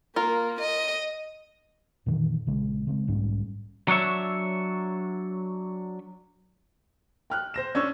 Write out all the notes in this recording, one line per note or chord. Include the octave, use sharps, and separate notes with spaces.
A#3 F4 A#4
D#5
F2 A#2 D#3 E3
A#1 C#3 G#3
C#3 G#3 C4
B1 G#2 G3 C#4
F#3 D4 C#5 E5
G5 F6 F#6
C5 A#6 E7
C#4 D4 C#6 E6 G#6